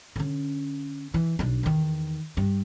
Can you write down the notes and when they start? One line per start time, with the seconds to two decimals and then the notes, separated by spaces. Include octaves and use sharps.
0.16 D3 C#4
1.14 E3
1.39 B1 D4
1.63 E2 D#3
2.37 G2